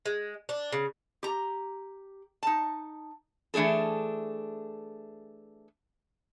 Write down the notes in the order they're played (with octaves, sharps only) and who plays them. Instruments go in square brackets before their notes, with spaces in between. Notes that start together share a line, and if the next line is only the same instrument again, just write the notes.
[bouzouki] G#3
D4
C#3
[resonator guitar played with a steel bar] G4 A#5
D#4 A5
E3 A3 D4 G#4 A4